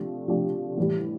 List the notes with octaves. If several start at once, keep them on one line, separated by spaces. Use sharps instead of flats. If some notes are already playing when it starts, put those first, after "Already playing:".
Already playing: C3 F3 A3 D4 G4
C3 F3 A3 D4 G4
A2 E3 G3